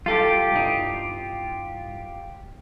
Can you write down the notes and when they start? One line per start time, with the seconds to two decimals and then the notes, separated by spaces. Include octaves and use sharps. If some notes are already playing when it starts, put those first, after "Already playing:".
0.06 G3 F4 G4 A4
0.52 C2 G2 D#4